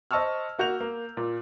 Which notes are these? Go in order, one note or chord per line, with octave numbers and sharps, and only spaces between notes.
C5 D#5 A5 C#6 E6 F6
A#3 F#4 G6 F7
A#3
A#2